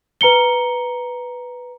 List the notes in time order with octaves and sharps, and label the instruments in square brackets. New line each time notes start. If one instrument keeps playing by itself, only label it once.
[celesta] B4 A#5 C#7 G7